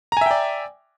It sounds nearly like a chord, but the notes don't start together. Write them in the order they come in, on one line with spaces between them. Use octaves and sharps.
A#5 G#5 E5 G5 D5